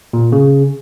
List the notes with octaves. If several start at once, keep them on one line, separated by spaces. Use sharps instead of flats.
A#2
C#3